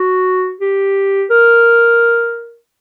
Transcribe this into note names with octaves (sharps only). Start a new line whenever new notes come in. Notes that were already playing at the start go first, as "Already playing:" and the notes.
Already playing: F#4
G4
A#4